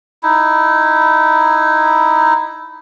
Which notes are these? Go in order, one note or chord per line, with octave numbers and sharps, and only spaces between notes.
D#4 E4